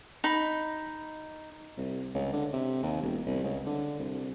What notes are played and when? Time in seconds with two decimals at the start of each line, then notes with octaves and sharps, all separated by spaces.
0.24 D#4 B5
1.77 C2
2.14 C#2
2.33 D3
2.53 C3
2.83 D#2
3.03 E1
3.26 C2
3.44 C#2
3.66 D3
3.99 C2